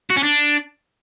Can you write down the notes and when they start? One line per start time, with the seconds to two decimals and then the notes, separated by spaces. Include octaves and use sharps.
0.10 F#4
0.16 C#4
0.23 D4